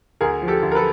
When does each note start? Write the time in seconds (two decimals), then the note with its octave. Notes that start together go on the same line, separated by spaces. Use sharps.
0.21 D2 G#4 A#4
0.42 F3
0.48 G4 A4
0.63 D2
0.72 A#4
0.75 A4 B4